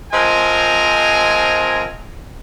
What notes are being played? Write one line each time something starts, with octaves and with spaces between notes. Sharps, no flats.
F3 G#3 C4 A#4 G#5